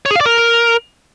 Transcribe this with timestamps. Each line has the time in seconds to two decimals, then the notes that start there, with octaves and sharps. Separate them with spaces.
0.06 C#5
0.11 G#4
0.16 F5
0.21 D5
0.26 A#4